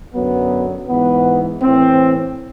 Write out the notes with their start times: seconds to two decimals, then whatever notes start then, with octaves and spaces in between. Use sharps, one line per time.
0.14 F#2 D3 F#3 B3
0.88 G#2 E3 B3
1.62 A2 E3 C4